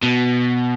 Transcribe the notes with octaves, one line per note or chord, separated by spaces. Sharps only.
B2